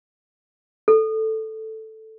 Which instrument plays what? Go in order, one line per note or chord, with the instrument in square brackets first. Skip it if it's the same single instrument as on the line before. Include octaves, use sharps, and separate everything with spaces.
[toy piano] A4